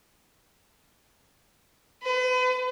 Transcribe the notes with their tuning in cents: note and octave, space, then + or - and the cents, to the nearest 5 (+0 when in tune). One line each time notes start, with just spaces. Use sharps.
B4 +40